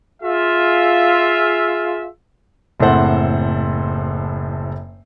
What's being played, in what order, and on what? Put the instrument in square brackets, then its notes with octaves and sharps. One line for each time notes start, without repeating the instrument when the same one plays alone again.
[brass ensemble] F4 G#4 E5
[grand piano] F#1 A2 C4 A4 C5 F#5